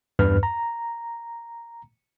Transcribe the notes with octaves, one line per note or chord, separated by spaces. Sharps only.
E2 G2 B4 F6
A#5